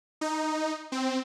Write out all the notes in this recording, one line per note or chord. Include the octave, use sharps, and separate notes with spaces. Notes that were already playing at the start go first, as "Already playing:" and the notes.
D#4
C4